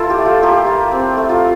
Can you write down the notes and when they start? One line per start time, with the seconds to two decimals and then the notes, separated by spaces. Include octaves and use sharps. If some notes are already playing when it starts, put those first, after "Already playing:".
Already playing: E4 F4 A4
0.10 G4
0.18 A3
0.26 F4
0.42 A#3 G4
0.66 A#3
0.91 C4
1.17 A3
1.29 F4